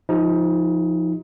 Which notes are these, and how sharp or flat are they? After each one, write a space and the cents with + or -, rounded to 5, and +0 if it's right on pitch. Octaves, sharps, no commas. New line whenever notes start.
F3 +0 D#4 +25 G4 +0